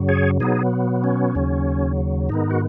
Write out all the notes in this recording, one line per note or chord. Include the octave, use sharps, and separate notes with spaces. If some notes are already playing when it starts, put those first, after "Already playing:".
Already playing: F#2 C#3 F#3
G#4 C#5
B2 F#3 B3 D#4 G#4
C#4
D#2 C#3 F#3
G#2 D#3 B3 D#4
F#4